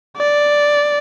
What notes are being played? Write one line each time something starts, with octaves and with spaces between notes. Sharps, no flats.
D5